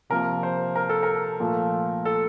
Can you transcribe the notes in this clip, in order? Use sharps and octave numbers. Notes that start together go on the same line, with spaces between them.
C3 F3 A#3 A#4
C5
A#4
A4
A#4
A#2 F3 A3
A4